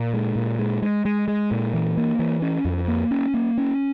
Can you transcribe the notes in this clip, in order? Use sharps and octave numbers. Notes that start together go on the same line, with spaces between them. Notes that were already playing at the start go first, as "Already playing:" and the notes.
Already playing: A#2
G#3
A#2
G#3
G#3
G#3
G#3
A#2
E3
A#3
E3
C#4
F2
A#3
C#4
A#3
C#4